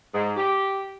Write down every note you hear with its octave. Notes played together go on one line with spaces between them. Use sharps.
G#2
G4